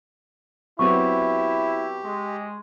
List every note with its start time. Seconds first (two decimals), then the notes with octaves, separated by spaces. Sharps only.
0.79 F#3 B3 C4 E4 G4 C#6
2.04 G#3